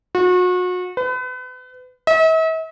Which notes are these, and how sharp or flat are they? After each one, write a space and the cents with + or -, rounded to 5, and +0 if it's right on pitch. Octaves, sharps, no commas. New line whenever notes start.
F#4 -35
B4 +35
E5 -45